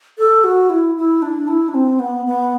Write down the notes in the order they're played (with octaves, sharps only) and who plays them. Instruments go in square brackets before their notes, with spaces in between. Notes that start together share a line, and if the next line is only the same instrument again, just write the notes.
[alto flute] A4
F#4
E4
E4
D4
E4
D4
C4
B3
B3